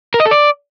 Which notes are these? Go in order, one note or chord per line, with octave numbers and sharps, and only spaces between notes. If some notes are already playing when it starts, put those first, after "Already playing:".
A#4
D#5
A4
D5